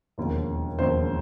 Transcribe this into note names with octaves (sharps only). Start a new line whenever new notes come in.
E1 D#2 C#3 F3
E1 D#2 C#3 F3 C5